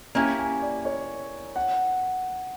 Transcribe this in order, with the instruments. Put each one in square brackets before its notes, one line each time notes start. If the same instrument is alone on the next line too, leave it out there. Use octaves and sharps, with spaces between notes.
[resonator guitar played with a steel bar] A#3 C#4 E4 G4 [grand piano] A#5
[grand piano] G#5
D5
C#5
F#5